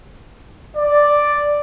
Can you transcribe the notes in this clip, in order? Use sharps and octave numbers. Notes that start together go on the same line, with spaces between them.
D5